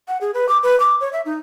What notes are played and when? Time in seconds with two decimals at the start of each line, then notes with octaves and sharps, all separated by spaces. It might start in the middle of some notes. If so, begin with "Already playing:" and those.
0.08 F#5
0.21 G#4
0.34 B4
0.49 D6
0.63 B4
0.80 D6
1.01 C#5
1.13 E5
1.26 D#4